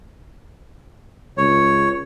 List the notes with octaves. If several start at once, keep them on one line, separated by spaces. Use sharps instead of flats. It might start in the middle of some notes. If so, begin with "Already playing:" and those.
C#2 C#5